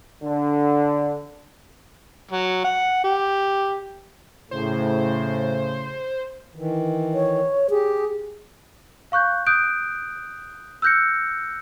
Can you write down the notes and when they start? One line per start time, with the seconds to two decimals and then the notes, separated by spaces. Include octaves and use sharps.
0.23 D3
2.31 F#3
2.65 F#5
3.04 G4
4.51 A2 C#3 C5
6.56 D#3 E3
7.14 C#5
7.70 G4 G#4
9.12 F5 C#6 F#6 G6
9.46 D#6 F#6 G6 D7
10.82 E6 F#6 G6 A#6 C#7